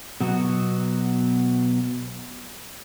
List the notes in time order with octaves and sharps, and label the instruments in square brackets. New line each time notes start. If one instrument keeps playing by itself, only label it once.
[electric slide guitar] B2 F#3 B3 F#4